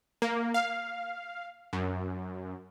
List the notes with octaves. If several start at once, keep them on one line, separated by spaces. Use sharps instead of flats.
A#3
F5
F#2